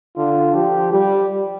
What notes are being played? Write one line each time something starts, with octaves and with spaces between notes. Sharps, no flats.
D3 F4
F3 G4
G3 G4